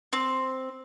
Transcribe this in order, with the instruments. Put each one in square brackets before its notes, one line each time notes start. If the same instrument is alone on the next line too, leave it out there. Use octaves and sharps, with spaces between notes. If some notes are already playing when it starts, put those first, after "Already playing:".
[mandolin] C4